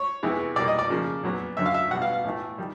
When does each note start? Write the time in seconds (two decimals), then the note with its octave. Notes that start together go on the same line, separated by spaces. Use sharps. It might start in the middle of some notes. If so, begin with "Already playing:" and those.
Already playing: C#5
0.23 C3 E3 G#3 B3
0.56 B2 G3 A#3 D5
0.68 D#5
0.79 D5
0.90 C#3 F3 A#3
1.23 A#2 F#3 B3
1.57 F#2 D3 F#3 E5
1.66 F5
1.74 E5
1.91 B2 G3 B3 F#5
2.02 F5
2.13 F5
2.24 A2 E3 A3
2.58 D#3 G3